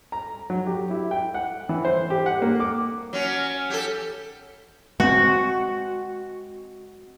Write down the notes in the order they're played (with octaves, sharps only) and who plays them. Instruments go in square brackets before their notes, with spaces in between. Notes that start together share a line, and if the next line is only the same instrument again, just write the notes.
[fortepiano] A#5
F#3
G4
E4
G5
F#5
E3
C5
G4
F#5
A#3
D6
[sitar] F#3 C#4
G4 A4
[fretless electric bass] G#3 C4 [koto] F#4